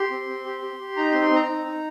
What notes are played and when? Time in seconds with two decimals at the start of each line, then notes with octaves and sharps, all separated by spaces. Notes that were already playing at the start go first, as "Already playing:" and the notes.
Already playing: G4 C6
0.11 C4
0.28 C4
0.45 G4
0.62 G4
0.80 G4
0.97 D#4 A#5
1.10 C6
1.13 C4
1.22 C6
1.31 C4 A#5
1.48 D#4
1.65 D#4